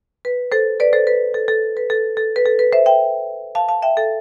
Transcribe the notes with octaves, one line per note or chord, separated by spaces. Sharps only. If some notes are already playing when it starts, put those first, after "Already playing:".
B4
A4 C5
B4 D5
A4 C5
B4
A4
A4
B4
A4
A4
B4
A4
B4
C5 E5
E5 G5
F5 A5
F5 A5
E5 G5
A4